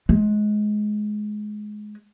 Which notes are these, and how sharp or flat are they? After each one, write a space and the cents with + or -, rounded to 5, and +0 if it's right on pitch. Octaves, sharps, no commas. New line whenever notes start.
G#3 +20